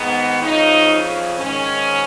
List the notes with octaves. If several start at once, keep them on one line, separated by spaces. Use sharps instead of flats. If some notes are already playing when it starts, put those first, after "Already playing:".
Already playing: G#2 D#3 B3
F2 C#3 F3 D#4
G#2 D#3 C#4